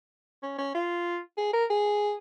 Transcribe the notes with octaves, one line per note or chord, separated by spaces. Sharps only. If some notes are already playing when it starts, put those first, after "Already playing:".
C#4
C#4
F4
G#4
A#4
G#4